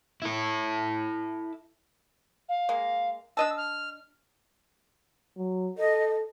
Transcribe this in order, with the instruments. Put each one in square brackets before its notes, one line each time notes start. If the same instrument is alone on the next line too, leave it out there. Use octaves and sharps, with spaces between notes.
[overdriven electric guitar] E4 A4
[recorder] F5
[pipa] G#3 A#3
[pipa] D4 D#5 A5 [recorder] E6
[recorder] F6
[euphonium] F#3
[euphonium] A4 [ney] D#5